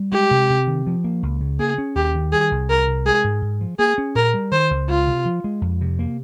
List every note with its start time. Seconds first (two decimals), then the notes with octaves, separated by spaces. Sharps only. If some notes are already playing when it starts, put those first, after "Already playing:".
Already playing: G3
0.12 G#3 G4
0.31 C3
0.50 C3
0.67 D#3
0.87 F3
1.04 A#3
1.23 C#2
1.41 C#3
1.59 A#3 G#4
1.78 C#4
1.95 D#2 G4
2.15 D#3
2.32 G3 G#4
2.51 C2
2.70 C2 A#4
2.88 C3
3.05 G#3 G#4
3.24 G#2
3.42 G#2
3.61 F3
3.79 A#3 G#4
3.98 C#4
4.15 A#2 A#4
4.34 G3
4.52 D#3 C5
4.71 C#2
4.89 C#2 F4
5.08 C3
5.25 F3
5.44 G#3
5.62 F2
5.81 C3
5.99 A#3